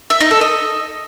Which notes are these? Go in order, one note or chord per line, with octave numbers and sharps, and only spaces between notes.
E5
D#4
A4
D#5